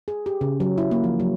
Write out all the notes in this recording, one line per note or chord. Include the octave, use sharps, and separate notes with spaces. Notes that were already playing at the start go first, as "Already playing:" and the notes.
G#4
G4
C#3
F#3
E4
A#3
F3
F#3